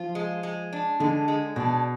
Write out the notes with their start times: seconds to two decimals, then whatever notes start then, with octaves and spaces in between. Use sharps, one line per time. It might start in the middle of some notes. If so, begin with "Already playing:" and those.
Already playing: F3 F4
0.15 G#3
0.43 G#3
0.73 D4
1.00 D3 G#3
1.28 G#3
1.56 B2 D4